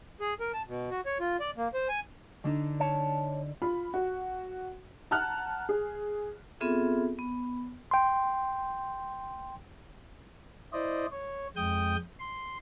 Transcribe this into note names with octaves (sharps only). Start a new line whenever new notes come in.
G#4
A#4
A5
B2
F#4
C#5
F4
D5
A#3
C5
G#5
D3 D4 D#4
C#5 A5
F4 B5
F#4
F#5 A5 A#5 F6 F#6
G#4
B3 C4 F4 G#4 A4 E5
B3
G5 C6
E4 C5 D5 D#5
C#5
F2 G#3 G5 D#6 G6
C6